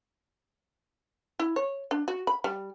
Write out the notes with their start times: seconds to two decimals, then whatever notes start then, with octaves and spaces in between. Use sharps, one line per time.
1.39 E4
1.56 C#5
1.91 D4
2.08 F#4
2.27 B5
2.44 G3